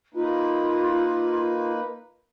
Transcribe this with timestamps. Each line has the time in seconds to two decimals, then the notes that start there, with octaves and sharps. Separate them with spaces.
0.14 A#3 D#4 F4 B4